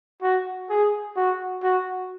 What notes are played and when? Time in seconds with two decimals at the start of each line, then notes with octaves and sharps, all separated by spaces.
0.22 F#4
0.70 G#4
1.16 F#4
1.63 F#4